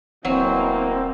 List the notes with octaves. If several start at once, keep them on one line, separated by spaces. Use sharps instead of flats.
D1 B2 E3 F#3 A#3 C4